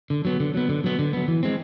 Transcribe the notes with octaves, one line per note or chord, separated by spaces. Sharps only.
D3
F#3 B3
D3
F#3 B3
D3
F#3 B3
D3
F#3 B3
E3
G#3 C4